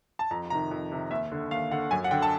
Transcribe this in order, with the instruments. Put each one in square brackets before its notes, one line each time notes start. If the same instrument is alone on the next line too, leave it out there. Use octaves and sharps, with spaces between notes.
[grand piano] A5
F2 A#5
C3 D#3 A#5
F2
C3 D#3
D#2 E5
D3
D#2 F5
D3 F#5
F#2 G#5
F#5
D3 G5
A5